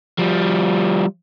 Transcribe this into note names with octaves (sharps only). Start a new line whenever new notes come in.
F3 G3